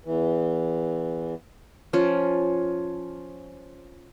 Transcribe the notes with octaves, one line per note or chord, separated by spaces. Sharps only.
E2 E3
F3 C#4